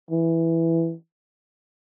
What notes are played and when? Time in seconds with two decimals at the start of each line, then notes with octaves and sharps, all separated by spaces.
0.11 E3